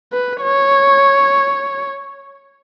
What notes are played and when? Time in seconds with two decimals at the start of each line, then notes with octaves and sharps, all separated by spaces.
0.13 B4
0.42 C#5